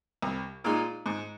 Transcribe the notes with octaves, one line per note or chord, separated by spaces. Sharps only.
C2
A#2 G#3 D#4
G#2